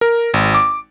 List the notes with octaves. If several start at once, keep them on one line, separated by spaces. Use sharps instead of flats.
A#4
G#1
D6